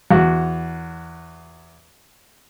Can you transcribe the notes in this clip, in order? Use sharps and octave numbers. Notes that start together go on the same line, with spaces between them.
E2 F#4